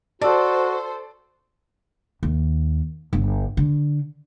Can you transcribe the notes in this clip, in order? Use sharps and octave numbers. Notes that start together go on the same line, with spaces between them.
F#4 A4 C5 D5 A5 E6
D#2
G1
D3